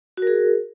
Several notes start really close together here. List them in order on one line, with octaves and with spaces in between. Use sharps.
F#4 A#4 G#4